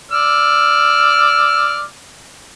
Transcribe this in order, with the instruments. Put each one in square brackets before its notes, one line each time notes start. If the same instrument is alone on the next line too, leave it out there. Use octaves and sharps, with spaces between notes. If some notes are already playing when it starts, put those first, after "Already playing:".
[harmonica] D5 E6 F6